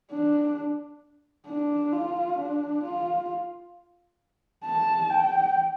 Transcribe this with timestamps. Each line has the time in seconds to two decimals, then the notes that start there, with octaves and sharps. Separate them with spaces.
0.11 D4
1.47 D4
1.93 F4
2.38 D4
2.84 F4
4.65 A5
5.11 G5